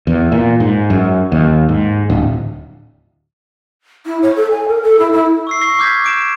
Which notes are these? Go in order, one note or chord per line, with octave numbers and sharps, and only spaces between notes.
E2
A#2
G#2
F#2
D#2
G#2
D1
E4
C#5
A4
G#5
A#4
A4
E4
E4
C#6 E6 C7
C#6 A#6 C7
D6 F6 G6 G#6 B6
D6 D7 E7